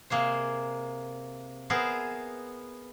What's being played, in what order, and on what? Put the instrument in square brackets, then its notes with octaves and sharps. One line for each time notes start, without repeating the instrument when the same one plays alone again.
[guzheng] C3 A#3 G#4 C5
B3 G#4 A#4 C5 E5